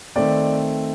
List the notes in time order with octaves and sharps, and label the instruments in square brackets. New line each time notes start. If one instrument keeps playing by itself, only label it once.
[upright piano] D#3 A3 C4 D5